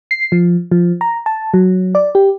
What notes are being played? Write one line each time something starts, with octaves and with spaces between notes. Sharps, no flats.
C7
F3
F3
A#5
A5
F#3
D5
G4